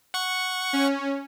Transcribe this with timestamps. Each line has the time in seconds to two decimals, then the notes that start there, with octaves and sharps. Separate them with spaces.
0.14 F#5 C#6
0.73 C#4